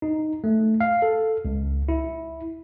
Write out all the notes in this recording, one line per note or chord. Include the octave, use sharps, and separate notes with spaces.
D#4
A3
F5
A4
C#2
E4